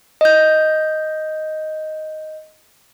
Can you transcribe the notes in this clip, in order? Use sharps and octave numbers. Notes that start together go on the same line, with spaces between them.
D#5 G6